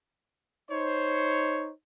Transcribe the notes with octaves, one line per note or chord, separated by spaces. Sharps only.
D#4 C5 C#5